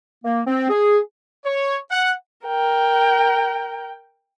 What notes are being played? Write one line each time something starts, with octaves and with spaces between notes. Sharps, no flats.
A#3
C4
G#4
C#5
F#5
A#4 G5